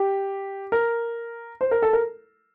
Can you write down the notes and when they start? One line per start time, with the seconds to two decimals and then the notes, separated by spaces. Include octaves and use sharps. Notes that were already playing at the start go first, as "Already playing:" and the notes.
Already playing: G4
0.72 A#4
1.61 C5
1.71 A#4
1.82 A4
1.93 A#4